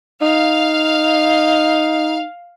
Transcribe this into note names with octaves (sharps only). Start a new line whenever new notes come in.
D#4 F5